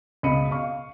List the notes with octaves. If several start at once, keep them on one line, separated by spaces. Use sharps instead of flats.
C#2 B2 D#5 B5 C#7 D#7
F5 C#6